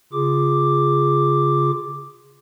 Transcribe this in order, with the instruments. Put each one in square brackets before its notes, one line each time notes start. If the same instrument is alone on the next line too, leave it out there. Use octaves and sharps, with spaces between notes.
[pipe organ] C#3 F4 G#4 D6